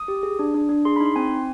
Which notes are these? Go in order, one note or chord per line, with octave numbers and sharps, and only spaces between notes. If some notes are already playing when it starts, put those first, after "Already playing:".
Already playing: D#6
G4
G#4
D4
D4
D4
G#4 C6
B5
D#4
C6
C4 G#5
C4